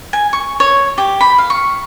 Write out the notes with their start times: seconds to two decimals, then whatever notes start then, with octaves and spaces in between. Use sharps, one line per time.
0.13 G#5
0.33 C#6
0.60 C#5
0.98 G4
1.21 B5
1.38 F5
1.50 C#6